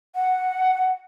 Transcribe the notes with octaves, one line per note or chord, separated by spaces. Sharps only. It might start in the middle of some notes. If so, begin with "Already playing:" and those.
F#5